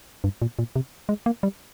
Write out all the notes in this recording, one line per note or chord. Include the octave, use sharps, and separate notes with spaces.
G2
A#2
A#2
C3
G#3
A#3
G3